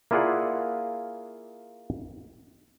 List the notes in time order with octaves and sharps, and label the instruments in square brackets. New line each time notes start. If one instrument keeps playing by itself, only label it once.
[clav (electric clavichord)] A#3 E4 F4 G#4 D5 F#5